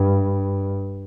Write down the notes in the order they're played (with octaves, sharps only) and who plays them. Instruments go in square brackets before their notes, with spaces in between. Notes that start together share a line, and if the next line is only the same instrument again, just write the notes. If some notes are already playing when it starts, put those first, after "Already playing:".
Already playing: [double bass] G2